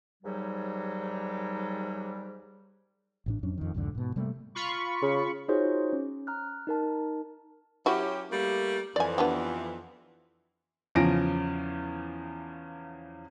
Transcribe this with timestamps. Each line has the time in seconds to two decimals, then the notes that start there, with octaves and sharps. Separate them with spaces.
0.23 D#2 G#2 F#3 G3
3.26 A1 A2 D4
3.43 F2 F#3 C#4 D4
3.58 F2 D#3
3.74 C2 F2 G#2 D3
3.95 G#2 B2
4.16 C3 G3 A3 A#3
4.55 F4 B5 C#6
5.02 C#3
5.48 D#4 F4 F#4 G#4 C5 C#5
5.93 C#4
6.27 A#5 F6 F#6
6.67 D#4 A#4 A5
7.86 F#3 C#4 E4 F#4 G4
8.31 G3 A3 A#3
8.96 F2 E3 D5 G#5
9.18 B3 D4 G4
10.95 E2 C#3 F3 C#4 A#6 D7